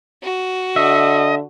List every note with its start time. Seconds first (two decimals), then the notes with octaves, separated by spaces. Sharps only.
0.23 F#4
0.76 D3 D#5 E5